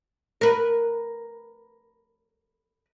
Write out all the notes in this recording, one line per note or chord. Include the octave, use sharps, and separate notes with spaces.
A#4 B4